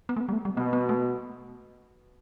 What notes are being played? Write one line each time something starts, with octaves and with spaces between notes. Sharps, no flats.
B3
A3
B3
G3
A3
G3
B2 B3
B3
A3